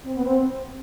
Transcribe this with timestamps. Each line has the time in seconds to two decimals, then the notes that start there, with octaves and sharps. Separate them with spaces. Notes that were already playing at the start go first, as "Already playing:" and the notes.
0.04 C4
0.15 B3
0.25 C4